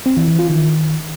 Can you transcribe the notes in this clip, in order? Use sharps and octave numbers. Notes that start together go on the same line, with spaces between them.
C4
E3
E3
F4
D#3